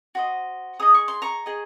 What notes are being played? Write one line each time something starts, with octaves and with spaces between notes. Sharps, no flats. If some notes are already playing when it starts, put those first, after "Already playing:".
F#4 C5 D#5
G#4 D#5 D#6
C#6
C6
A#5 C#6
G#4 D#5